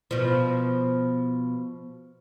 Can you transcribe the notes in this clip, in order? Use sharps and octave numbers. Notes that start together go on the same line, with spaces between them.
B2 F3